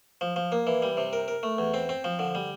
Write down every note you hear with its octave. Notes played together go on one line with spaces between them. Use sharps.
F3
F3
A#3
E3
G3
C3
A#4
A#4
A3
E2
C4
C4
F3
D3
G3